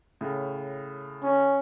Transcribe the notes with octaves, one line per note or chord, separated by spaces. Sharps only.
A2 C#3
C#4